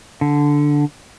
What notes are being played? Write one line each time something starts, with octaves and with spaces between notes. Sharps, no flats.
D3